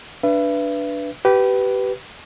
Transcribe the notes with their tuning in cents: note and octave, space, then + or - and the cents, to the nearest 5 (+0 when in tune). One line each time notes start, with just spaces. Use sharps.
D4 +0 B4 +0 E5 +40
G4 -25 B4 +0